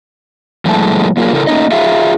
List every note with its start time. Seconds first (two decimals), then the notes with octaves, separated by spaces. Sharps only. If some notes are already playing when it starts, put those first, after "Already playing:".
0.65 A#2 E3 F#3 G#3 A3 A5
1.17 F#3 A#3 F4 G4 G#4 A#4
1.33 C#3 E4 A4 A#4
1.47 A3 A#3 C#4 D#4 D#5
1.72 F4 G#4 E5 F5